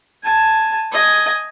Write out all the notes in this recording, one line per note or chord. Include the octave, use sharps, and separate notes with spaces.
G#5 A5
D#5 G#5